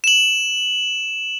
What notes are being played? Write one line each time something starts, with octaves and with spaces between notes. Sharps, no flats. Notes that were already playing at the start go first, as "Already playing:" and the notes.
E7 F#7